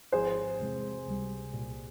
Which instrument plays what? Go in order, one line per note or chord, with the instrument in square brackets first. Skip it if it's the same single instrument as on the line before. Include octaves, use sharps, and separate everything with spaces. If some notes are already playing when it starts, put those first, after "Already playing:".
[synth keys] G#1 G#2 F3 C4 E4 [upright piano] G#4 C5
[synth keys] E2 C3 E3 G#3 C4
C#2 C3 G3
C2 A#2 G3